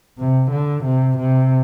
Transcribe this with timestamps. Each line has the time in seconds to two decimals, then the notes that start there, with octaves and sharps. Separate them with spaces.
0.18 C3
0.51 D3
0.84 C3
1.18 C3